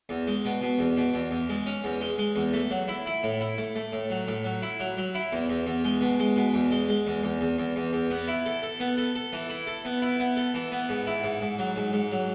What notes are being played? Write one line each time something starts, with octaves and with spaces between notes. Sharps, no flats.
E2
G#3
B2
B2
E2
B2
E2
E2
G#3
C#4
E2
G#3
G#3
E2
A3
F#3
E4
E4
A2
E4
A3
A3
A2
F#3
A2
F#3
E4
F#3
F#3
E4
E2
E2
E2
G#3
B2
G#3
B2
E2
G#3
G#3
E2
E2
E2
E2
E2
E2
B3
E4
A4
A4
B3
A4
A4
E3
E4
A4
B3
E4
B3
A4
E3
B3
G#2
E4
G#2
G#2
F#3
G#2
G#2
F#3